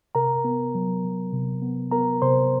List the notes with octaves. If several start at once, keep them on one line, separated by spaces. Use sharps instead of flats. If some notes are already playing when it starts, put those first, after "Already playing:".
C3 A#4 A#5
B3
F#3
F#3
C3
B3
B3 A#4 A#5
C3 C5 C6